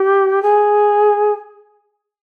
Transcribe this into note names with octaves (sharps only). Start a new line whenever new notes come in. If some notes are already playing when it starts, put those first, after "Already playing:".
Already playing: G4
G#4